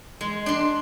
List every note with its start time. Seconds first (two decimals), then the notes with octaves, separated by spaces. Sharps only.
0.21 G#3
0.46 D4 C6